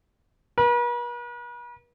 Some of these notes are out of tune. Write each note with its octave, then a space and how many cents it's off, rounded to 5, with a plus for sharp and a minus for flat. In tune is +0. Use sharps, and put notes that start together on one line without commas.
B4 -45